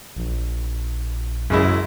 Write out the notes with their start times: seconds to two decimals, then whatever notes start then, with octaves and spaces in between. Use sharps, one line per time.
0.16 A#1
1.50 F#2 C#3 G#3 E4